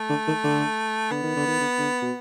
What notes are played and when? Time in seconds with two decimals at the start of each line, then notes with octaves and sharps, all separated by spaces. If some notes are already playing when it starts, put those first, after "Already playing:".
Already playing: A3
0.10 D3
0.27 D#3
0.44 D3
1.11 D3 B3
1.23 D#3
1.36 D3
1.47 D#3
1.60 D3
1.78 D3
2.02 B2